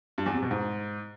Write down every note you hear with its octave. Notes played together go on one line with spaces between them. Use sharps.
G2
E2
C3
B2
G#2